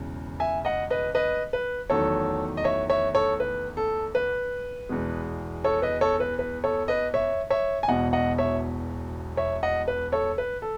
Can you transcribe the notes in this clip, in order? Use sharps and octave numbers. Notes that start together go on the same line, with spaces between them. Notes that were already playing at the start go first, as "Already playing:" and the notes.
Already playing: E1 E2 C#3
E5 G#5
D#5 F#5
B4 D#5
B4 D#5
B4
E2 D#3 F#3 A3 A4 C#5
D#5
C#5 E5
C#5 E5
A4 C#5
B4
A4
B4
E2 B2 G#3
A4 C#5
B4 D#5
A4 C#5
B4
B4
A4 C#5
B4 D#5
C#5 E5
C#5 E5
G#5
E1 E2 B2 D#5 F#5
D#5 F#5
C#5 E5
C#5 E5
D#5 F#5
B4
A4 C#5
B4
A4